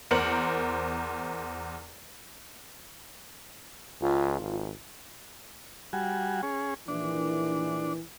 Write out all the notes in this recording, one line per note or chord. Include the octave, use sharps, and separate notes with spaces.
E2 A#4 C5 C#7 F#7
C#2 F4
G#1
G3 F#4 G#5
C#4 G#4
A#1 D#3 E3 D4